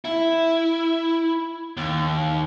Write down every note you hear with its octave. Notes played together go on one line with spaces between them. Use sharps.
E4
D#2